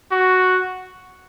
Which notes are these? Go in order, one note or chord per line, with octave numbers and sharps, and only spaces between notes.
F#4